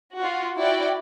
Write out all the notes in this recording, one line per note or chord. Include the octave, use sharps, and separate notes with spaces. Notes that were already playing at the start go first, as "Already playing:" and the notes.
F4 F#4
E4 F#4 D5 G5